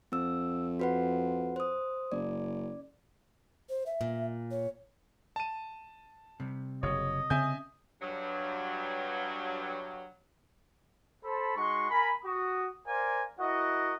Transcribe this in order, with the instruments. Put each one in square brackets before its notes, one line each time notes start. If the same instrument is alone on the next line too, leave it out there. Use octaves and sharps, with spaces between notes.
[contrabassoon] F2 [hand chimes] C4 E6
[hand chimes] F#4 B4 F#5
C5 D#6
[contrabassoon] F#1 [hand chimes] D5
[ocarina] C5
E5
[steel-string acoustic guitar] A#2
[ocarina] C#5
[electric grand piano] A5 D#7
[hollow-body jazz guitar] C3 G3
[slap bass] F#1 C#3 [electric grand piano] C#5 [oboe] D#5
[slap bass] C#3 C4 C#4 [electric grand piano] E5 G#5 G6
[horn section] G2 F#3
[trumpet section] A4 C5 A5 B5
G#3 D#4 F#4 C6 C#6
A#4 G#5 B5
F#4 D#6
A#4 C5 D5 F5 G#5
E4 F#4 A#4 D#5 F#5